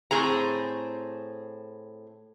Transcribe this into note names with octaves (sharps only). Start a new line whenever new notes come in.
A2 C4 G#4 A#5